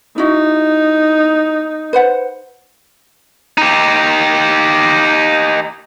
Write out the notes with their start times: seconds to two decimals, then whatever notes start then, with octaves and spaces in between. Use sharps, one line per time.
0.18 D#4 E4 F#4
1.93 B4 C5 F#5
3.58 D#4 G4